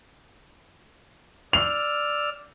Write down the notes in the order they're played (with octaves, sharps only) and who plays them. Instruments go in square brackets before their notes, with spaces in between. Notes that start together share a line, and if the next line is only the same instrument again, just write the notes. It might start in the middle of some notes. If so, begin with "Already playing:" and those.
[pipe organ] D5 E6 F6 [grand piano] F7